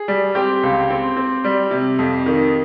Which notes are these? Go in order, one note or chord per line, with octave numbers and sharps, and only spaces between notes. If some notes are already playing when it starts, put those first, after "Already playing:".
Already playing: G#4
G3
C4 G4
C#2
C4
C4
G3
C3
F2
D#3